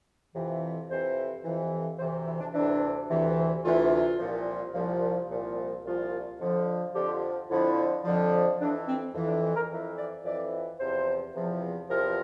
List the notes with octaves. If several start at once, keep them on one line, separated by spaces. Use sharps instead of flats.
F2 C3 E3
F2 C3 E3 C5
F2 C3 E3
D2 C3 E3 C5
E4
D4
D2 C3 E3 D4
D2 C3 E3
D2 C3 E3 F4
C2 A#2 F3
C2 A#2 F3
C2 A#2 F3
C2 A#2 F3 F4
F2 D3 F3
F2 D3 F3 G4
F2 D3 F3 E4
F2 D3 F3
F2 E3 D4
C4
F2 E3
D4
C4
A#4
F2 E3
D5
F2 E3 D5
E2 C3 F3 C5
E2 C3 F3
E2 C3 F3 A#4